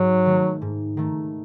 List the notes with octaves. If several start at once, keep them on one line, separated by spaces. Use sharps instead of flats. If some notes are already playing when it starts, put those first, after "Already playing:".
Already playing: G#2 F#3
D#3 A3
G#2
D#3 A3